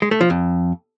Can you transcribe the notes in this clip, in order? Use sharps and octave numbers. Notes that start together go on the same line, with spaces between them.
G#3
A3
F3
F2